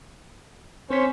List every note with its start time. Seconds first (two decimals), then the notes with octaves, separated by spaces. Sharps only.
0.91 C4 C#4 C5 B6